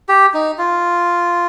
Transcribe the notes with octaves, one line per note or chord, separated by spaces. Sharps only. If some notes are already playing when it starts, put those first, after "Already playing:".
G4
D#4
F4